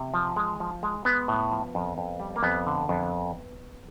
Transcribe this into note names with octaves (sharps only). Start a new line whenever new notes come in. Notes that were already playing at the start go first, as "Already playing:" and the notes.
Already playing: C3
F3
G#3
F3
G#3
G#3 B3
A2
F3
F2
F2
G3
A#3
F2 B3
D3
F2